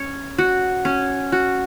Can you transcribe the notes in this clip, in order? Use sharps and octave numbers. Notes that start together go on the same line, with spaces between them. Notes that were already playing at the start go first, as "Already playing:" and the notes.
Already playing: C#4 C#5
F#4
C#4
F#4